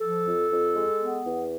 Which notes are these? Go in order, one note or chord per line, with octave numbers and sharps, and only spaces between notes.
F3 A4
F2
F2
G#3
B3
E2